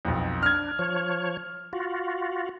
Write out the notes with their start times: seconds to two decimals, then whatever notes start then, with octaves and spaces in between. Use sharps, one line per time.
0.05 B1 F2
0.43 D4 F6 G#6
0.79 F3 C#5
1.73 F4 F#4